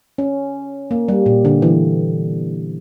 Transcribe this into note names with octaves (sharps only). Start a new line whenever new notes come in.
C#4
A#3
G3
A#2
D3
E3